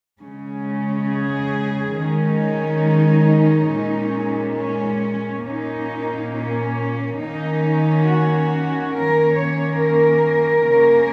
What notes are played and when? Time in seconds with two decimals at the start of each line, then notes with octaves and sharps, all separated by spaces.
0.21 C#3 G#3 C#4
1.09 G#4
1.96 D#3 G#3 C#4 D#4
3.71 A#2 G#3 C#4
4.58 C#4
5.45 A#2 A#3 C#4 D#4
6.33 C#4
7.20 D#3 A#3 C#4 D#4
8.09 F#4
8.95 D#3 A#3 C#4 A#4
9.39 C#5
9.83 A#4
10.70 C#3 A#3 C#4